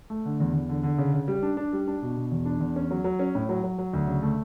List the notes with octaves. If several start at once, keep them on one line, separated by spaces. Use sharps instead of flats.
A3
D3
E2
E2
D3
D3
C#3
C#3
G3
D4
D4
G3
D4
B2
B2
E2
D4
E2
C#4
F#3
F#3
C#4
A2
F#3
F#3
F#3
D2
C#3
A3